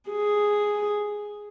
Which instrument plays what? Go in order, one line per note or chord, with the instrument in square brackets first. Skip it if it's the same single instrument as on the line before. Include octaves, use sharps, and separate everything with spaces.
[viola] G#4